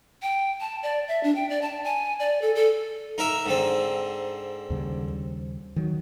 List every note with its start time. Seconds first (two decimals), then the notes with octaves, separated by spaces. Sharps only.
0.22 G5
0.61 A5
0.83 D5
1.08 E5
1.23 D4
1.35 G5
1.50 D5
1.62 A5
1.84 G#5
2.19 D5
2.42 A4
2.55 A4
3.18 D#4 A#4 E5
3.46 G#2 D3 C4
4.70 D#2 C#3 G3
5.76 D#3 F#3